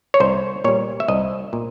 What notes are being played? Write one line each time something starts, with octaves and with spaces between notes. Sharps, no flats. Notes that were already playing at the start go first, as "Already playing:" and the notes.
C#5
C2 C5
A#2 G3 C#5
E5
C2 D#5
A#2